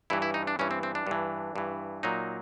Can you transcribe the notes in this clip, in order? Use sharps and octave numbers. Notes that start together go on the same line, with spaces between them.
G2 E3 E4
E4
D#4
D4
G2 E3 C#4
C4
C4
D4
G2 E3
G2 E3
A#2 F#3 D#4